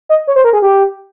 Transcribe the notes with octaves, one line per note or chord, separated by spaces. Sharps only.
D#5
C#5
C5
A#4
G#4
G4